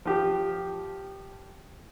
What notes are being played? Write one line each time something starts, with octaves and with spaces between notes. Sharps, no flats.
F3 G4